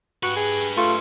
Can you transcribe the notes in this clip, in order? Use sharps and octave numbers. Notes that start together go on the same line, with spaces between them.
F#4 G4 B4
G#4
A3 F4